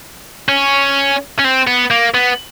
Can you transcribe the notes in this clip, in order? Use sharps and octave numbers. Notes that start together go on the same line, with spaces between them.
C#4
C#4
C4
B3
A#3
B3